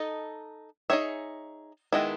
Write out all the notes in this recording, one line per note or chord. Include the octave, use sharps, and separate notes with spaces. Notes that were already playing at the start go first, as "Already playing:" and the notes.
Already playing: D#4 A4 D#5
D#4 G#4 C#5 E5
D#3 G#3 B3 E4